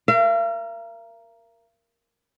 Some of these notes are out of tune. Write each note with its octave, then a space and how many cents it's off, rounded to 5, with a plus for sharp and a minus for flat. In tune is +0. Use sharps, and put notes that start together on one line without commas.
A#4 +0 F5 -45